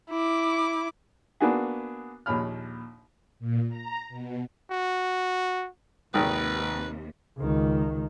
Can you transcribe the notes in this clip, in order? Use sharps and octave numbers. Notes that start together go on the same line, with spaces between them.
E4 D6
A#3 B3 D4 F#4 G#4
A#1 D#2 C#5 B5 F6
A#2
A#5
B2
F#4
G#1 D#2 C3 D#3 B4
C#2 D#3